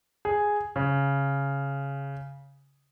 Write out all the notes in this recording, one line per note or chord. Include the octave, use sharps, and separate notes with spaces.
G#4
C#3